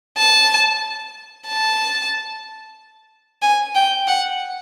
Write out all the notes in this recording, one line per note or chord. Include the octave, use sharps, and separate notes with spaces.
A5
A5
G#5
G5
F#5